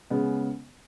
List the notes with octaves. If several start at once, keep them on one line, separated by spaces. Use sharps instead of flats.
C#3 G#3 B3